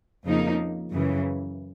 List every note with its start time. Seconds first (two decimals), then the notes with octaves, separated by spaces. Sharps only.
0.25 F2 C#3 F3 A#3 D#4
0.93 F#2 C#3 E3